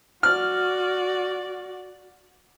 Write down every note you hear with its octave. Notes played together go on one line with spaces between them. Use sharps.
F#4 D5 F6